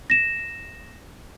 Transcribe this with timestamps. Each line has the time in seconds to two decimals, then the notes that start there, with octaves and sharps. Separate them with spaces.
0.10 A#6 E7